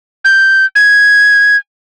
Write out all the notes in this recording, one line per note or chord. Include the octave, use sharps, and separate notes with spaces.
G6
G#6